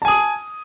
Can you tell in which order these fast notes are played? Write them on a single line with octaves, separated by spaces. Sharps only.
A5 G#5 D#6